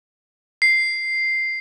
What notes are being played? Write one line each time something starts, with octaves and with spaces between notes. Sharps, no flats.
C7